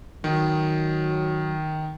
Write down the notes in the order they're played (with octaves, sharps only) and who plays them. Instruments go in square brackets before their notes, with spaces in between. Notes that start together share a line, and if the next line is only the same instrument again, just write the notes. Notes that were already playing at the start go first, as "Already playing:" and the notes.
[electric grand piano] D#3 [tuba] F#3